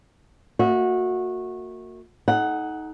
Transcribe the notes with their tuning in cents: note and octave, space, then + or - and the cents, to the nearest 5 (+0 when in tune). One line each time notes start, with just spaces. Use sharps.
A#3 -30 F#4 -20 E5 -40
D#4 +15 A4 -35 F#5 +10